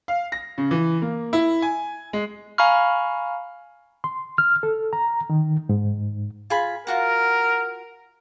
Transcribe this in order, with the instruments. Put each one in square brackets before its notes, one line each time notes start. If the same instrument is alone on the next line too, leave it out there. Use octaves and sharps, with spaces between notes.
[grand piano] F5
A#6
C#3
E3
A#3
E4
G#5
G#3
[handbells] F5 G#5 A#5 B5 C#6 F6
[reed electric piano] C6
F6
A4
A#5
D#3
G#2
[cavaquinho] F4 G#4 B5
[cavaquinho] F4 F#4 F#5 [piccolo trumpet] A#4